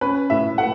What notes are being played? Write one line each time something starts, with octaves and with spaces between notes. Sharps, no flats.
C#4 B4
A2 E5
A3 F#5